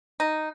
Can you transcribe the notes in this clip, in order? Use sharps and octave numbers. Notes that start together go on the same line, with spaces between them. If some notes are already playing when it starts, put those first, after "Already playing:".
D#4